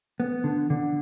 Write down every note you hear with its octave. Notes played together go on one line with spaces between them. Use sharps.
B3
D3
D3